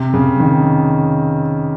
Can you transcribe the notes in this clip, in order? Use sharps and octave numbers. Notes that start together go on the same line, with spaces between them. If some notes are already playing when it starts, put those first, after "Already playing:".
Already playing: C3
C#3
D#3